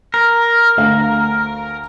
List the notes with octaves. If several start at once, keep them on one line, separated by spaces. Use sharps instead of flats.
A#4
D2 A3 F5